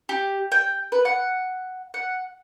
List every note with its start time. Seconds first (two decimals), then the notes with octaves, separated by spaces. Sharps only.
0.09 G4
0.52 G5
0.92 B4
1.05 F#5
1.94 F#5